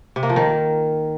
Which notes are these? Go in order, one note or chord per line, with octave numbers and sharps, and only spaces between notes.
C3
A#3
F3
D#3